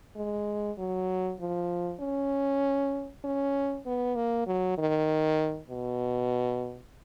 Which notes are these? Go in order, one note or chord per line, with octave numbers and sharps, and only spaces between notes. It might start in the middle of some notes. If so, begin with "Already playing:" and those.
G#3
F#3
F3
C#4
C#4
B3
A#3
F#3
D#3
B2